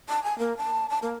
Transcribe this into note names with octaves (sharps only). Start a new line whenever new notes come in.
A5
G#5
A#3
A5
A5
A#3